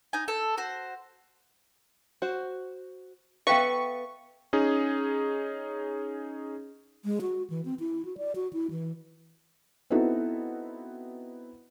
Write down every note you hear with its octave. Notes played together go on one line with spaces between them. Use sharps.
D#4 G#5
A4
F#4 C5
F#4 C5
B3 A4 B4 E5 F5 G5 C#6
C#4 D#4 G#4
G#3
F#4
E3
C4
E4
F#4
D5
F#4
E4
E3
B3 C4 D#4 E4 F#4 A4